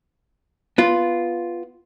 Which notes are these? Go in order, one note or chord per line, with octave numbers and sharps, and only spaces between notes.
B3 F4